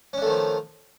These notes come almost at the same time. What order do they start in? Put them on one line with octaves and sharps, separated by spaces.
C#4 D4 A3 D#3 F3